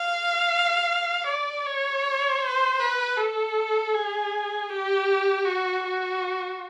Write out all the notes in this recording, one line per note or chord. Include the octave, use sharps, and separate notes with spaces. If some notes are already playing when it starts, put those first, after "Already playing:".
Already playing: F5
D5
C#5
C5
B4
A4
G#4
G4
F#4
F#4